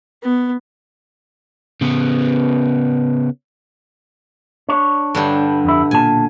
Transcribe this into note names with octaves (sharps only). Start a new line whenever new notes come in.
B3
C#3 B3
D4 C#5
G2 D3 G3
F2 E4
B1 A#2 G#5 A5